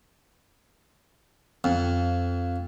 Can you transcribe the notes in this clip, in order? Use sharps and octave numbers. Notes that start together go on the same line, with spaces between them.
F2